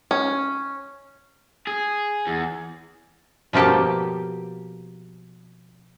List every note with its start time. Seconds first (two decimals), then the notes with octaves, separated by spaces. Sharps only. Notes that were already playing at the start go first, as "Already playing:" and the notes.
0.11 C#4
1.67 G#4
2.27 E2
3.53 B2 F3 A#3 G4 A4